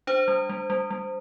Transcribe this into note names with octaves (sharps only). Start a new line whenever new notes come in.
D4 C5
G3
G3
G3
G3